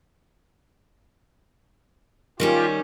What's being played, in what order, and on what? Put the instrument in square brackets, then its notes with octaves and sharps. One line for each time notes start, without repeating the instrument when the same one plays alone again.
[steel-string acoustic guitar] D#3 G3 C#4 [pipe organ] F4 G4